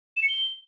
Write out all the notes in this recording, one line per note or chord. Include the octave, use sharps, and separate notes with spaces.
E7
C#7
G7